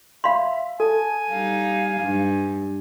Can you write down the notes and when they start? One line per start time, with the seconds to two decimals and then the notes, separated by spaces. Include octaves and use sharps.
0.24 E5 F5 B5 C6
0.80 A4 G#5 A5
1.30 G3 D#4 F5
2.01 G2